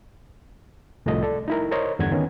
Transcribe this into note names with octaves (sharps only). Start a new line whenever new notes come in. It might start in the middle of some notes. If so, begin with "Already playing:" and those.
C2 A2 F3 A3 D#5
A4 D5
D#4 E4 A#4
A#4 C5 C#5 D#5
E2 G2 D3 F#5 G#6
D#3 B3 C#4